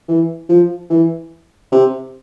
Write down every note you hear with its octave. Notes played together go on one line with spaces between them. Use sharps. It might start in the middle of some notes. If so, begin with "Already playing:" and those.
E3
F3
E3
C3